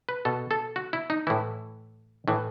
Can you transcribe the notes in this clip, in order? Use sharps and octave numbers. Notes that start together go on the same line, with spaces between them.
B4
B2 A4
A4
F#4
E4
D#4
A2 E3 E4
A2 E3